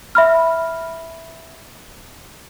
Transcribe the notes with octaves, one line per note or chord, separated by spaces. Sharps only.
E5 B5 F6